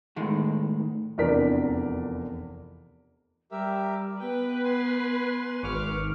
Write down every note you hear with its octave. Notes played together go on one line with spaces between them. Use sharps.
A2 D#3 G#3
F1 E2 D4 A#4 D5 B6
G3 G4 A#4 E5
B3 B4 G5
G#5 C6
G#1 C#6 D6 F6